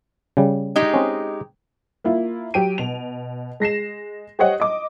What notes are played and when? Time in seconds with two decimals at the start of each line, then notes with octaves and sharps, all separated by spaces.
0.37 C#3 G3
0.76 G#3 D#4 G4
0.94 C4 C#4
2.04 A#3 E4 F4
2.54 F#3 G4 D7 D#7
2.78 B2 F7
3.60 G#3 A#6 C7 E7
4.39 G4 C5 C#5 D#5 F#5
4.60 D#5 D6